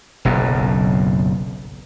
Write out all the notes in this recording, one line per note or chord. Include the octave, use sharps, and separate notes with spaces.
F#1 B1 F#2